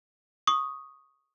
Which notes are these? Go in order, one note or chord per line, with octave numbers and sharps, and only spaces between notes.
C#6 D#6